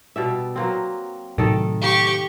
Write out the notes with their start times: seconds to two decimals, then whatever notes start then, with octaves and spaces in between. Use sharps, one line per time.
0.16 B2 G3 E5
0.56 F#3 A#3 C4
1.38 A2 C3 D#3 F#3 A4
1.82 G4 C#6